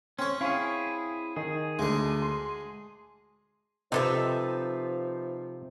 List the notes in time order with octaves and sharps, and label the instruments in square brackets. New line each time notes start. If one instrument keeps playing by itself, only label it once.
[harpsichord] C4 C#5 [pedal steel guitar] C#4
[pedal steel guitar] E4 G#4 [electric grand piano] F5 C#6
[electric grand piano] D#3 D#5 [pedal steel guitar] G#4
[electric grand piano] D2 [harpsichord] G#3 D4
[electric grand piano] C6
[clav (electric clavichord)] C3 A4 [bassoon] F3 [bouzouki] D#4 B4 E5